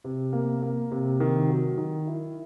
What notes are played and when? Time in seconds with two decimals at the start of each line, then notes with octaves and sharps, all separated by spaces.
0.04 C3
0.33 A#3
0.62 A#3
0.91 C3
1.20 D#3
1.50 F#3
1.78 D#3
2.07 E4